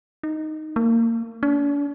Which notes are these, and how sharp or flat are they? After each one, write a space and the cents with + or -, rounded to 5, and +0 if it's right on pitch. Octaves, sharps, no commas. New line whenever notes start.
D#4 +0
A#3 -25
D4 -40